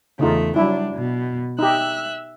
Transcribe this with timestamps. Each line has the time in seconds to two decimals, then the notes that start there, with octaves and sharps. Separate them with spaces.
0.19 E2 C#3 A3 D#4 F4
0.56 F#3 G3 D4 E4
0.94 B2
1.59 D#4 G4 E5 E6 F#6